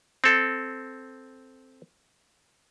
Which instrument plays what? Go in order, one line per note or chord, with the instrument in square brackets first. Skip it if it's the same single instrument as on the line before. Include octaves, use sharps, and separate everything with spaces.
[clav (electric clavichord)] C4 A4